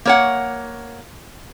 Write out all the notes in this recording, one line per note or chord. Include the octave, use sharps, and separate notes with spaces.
A#3 C#5 F#5